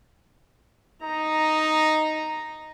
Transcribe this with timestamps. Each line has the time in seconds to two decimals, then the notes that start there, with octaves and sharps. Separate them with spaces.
1.02 D#4 A#5